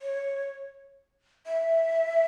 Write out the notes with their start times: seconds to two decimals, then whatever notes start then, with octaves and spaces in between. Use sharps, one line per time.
0.02 C#5
1.46 E5